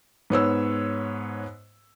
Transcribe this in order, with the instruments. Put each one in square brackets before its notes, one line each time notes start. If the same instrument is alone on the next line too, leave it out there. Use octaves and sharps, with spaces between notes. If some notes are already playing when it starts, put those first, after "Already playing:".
[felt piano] G#2 B3 C#5 E6